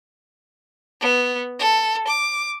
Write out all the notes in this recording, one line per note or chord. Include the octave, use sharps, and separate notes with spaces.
B3
A4
D6